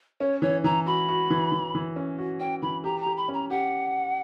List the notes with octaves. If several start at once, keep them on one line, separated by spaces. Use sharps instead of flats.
C#4 C#5
E3 C#5
E3 A#5
F#4 B5
F#4
E3
E3
E3
C#4
F#4
C#4 G5
E3 B5
G4 A#5
A#5
G4
B5
C#4
A#5
G4 F#5